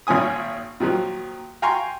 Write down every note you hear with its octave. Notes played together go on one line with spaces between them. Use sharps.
G#1 A#2 C#4 G#5 D#6
A#2 D#3 F3 F#3
F5 G5 G#5 A#5 C6 C#6